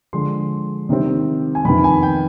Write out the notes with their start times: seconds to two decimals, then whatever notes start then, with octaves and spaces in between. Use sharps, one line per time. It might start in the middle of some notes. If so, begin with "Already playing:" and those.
0.13 D3 F3 G#3 C6
0.89 C3 D#3 G3 C4
1.55 G#5
1.65 F2 C3 D#3 B3 B5
1.84 G#5
2.03 G5